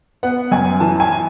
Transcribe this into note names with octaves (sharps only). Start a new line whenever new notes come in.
B3 F#5
F#2 G#5
E3 A5
G#5